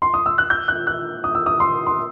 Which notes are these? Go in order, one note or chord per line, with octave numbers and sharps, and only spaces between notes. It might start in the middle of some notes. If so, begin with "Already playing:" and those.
C6
D#6
E6
F#6
G6
F#6
F#6
D#6
E6
D#6
C6
C6